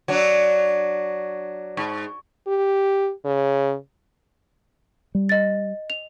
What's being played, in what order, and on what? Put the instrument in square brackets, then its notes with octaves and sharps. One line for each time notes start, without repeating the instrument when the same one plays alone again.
[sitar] F#3 D4
G#2
[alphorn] G4
C#3
[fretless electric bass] G3
[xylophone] D#5 A6
F7